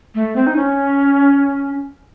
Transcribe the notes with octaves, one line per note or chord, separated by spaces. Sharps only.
A3
C4
D#4
C#4